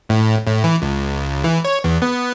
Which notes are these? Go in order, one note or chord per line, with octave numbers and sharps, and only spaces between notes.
A2
A2
E3
C#2
E3
C#5
E2
B3